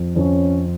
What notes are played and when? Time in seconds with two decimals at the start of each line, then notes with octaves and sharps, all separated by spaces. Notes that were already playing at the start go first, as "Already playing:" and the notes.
Already playing: F2
0.15 F2 C#4